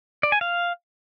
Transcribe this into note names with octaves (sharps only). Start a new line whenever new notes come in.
D5
G#5
F5